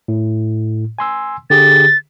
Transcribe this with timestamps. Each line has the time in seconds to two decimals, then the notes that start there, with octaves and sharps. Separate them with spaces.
0.08 A2
0.99 G#5 C6 E6
1.50 D3 G4 G#4 A6